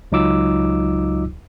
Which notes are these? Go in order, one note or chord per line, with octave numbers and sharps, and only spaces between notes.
C#2 F#3 D#4 F4 D6 E6